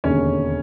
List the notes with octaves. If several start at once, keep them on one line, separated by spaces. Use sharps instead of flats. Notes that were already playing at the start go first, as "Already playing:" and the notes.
E1 D#2 D3 C#4 C#5